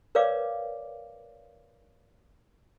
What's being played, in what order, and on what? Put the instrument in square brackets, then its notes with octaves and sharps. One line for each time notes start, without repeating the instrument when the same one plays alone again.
[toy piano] A#4 B4 C#5 D5 F5 D6